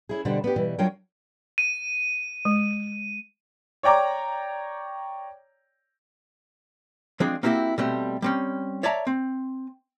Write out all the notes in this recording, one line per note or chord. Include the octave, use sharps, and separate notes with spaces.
C#4 E4 G#4
B2 D3 G3 D4 C5 F#5
B3 D4 G4
B2 E3 G3
F#3 D4 F4 A#4 C#5 G5
D#7
G#3
C#5 D5 G5 A#5 D6
F3 G#3 C4 D4 G#4
A#3 C4 E4 F#4 G4
B2 G3 A3 C4
G3 C4 C#4
C#5 D5 E5 A5 A#5
C4